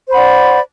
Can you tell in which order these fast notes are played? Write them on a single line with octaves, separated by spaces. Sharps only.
C5 B5 F#5 D5